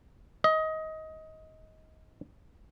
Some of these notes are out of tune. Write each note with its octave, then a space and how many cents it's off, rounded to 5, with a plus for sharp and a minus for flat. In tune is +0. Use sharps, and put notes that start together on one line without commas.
D#5 +20